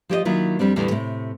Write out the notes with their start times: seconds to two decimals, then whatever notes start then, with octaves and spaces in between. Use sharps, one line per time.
0.09 F3 G4 C#5 D#5
0.25 D#3 F#3 A#3 E4 F4
0.59 F2 G3 C4 D4
0.76 E2 A2 D3 E3 G3
0.91 A2 C3